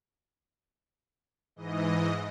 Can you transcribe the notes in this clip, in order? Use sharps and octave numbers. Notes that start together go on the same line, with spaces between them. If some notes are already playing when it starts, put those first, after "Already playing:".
G#2 E3 D#5